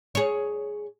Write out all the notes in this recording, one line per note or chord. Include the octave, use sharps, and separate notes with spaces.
G#4 C#5